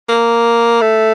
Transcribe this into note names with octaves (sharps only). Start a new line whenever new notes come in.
A#3
A3